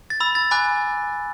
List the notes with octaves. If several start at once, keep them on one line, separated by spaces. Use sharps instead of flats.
A6
B5 E6
A6
G#5 B5 D6 F#6